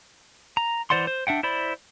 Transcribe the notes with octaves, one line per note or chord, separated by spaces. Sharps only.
A#5
E3 C5 D5 F#5 C6
C5
D4 E5 F#5 G5
E4 C5 D5 B5